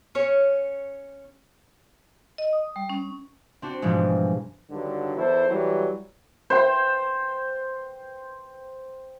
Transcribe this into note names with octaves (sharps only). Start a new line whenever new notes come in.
C#4 C#5
D#5
D#6
G3
C#4
C4 D4 F#4
G#2 B2 E3 F3 G3 G#3
G2 D3 D#3 F#3
E2 E4 A4 C5
E3 F#3 G3
C5 G5